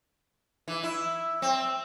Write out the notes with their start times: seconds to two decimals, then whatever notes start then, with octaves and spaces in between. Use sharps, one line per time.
0.68 E3
0.83 E4
1.42 C4